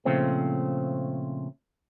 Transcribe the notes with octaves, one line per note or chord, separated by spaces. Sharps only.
A#2 C#3 F3 A3 C4